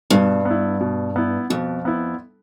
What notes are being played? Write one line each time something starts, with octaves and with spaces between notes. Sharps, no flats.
G2 B2
B3 E4
B2
B3 E4
F2 B2
B3 E4